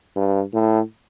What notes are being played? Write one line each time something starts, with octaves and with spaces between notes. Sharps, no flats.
G2
A2